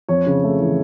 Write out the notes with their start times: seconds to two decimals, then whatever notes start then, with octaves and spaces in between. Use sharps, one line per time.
0.09 F2 C#5
0.27 C#3
0.44 A3
0.60 E3